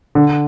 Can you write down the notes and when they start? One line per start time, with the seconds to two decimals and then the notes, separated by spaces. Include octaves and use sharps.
0.15 D3